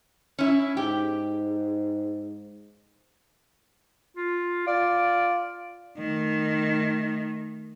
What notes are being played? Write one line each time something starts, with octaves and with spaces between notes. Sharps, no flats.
C#4 E4
G#2 G4
F4
F4 D5
D#3 A3